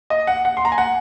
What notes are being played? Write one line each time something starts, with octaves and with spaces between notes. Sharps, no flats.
D#5
F#5
F#5
C6
A#5
G#5
F#5